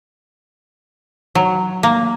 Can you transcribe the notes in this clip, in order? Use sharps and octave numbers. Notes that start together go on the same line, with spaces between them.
F#3
A#3